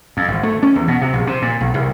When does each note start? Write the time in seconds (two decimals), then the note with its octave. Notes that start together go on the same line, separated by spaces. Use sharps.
0.17 F2
0.28 G#1
0.43 A3
0.63 C#4
0.75 E2
0.88 B2
1.01 C3
1.13 A#1
1.27 C3
1.42 A#2
1.60 B1
1.74 C2